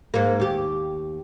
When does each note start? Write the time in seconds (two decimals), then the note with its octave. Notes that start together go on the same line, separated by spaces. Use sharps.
0.14 G#2 A#3
0.40 D#2 G4